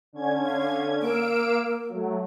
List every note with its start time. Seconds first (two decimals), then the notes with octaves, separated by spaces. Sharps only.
0.13 D3 C#4 G#6
0.45 F5
1.01 A#3 F5 E6 D7
1.89 F#3 A3